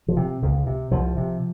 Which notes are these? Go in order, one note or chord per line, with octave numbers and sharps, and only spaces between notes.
F3
C3
C#2
C3
C2 F3
C3